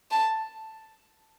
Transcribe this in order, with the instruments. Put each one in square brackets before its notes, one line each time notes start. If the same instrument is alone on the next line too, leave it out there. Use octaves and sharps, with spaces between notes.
[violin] A5